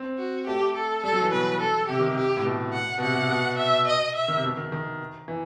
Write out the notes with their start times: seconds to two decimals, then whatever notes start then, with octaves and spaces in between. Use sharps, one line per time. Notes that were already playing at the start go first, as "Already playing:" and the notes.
Already playing: C4
0.18 F#4
0.46 A3 G4
0.75 A4
1.03 G3 A4
1.13 F#3
1.22 E3
1.32 B2 B4
1.60 A4
1.88 C3 G4
2.00 D#3
2.11 C3
2.17 G4
2.37 A2
2.45 B2
2.73 F#5
2.98 B2
3.02 C3 F#5
3.16 C3
3.30 B2
3.58 E5
3.87 D#5
4.15 E5
4.28 D#3
4.36 C3
4.43 B2
4.57 D#3
4.72 D#3
5.28 E3